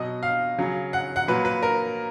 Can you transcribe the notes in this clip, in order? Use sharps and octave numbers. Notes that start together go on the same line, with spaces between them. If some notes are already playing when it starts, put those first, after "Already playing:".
Already playing: B2 F#3 D#5
F5
C#3 F#3
F#5
F#5
A#2 F#3 B4
B4
A#4